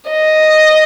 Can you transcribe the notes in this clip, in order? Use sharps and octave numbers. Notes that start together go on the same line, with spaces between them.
D#5